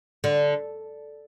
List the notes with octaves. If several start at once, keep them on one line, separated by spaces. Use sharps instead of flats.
D3